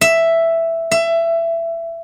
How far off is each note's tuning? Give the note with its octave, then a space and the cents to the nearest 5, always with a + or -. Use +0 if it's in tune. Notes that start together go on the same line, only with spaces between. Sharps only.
E5 +5
E5 +20